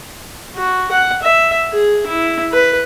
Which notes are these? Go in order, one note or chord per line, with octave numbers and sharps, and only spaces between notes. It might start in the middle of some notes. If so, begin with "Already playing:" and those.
F#4
F#5
E5
G#4
E4
B4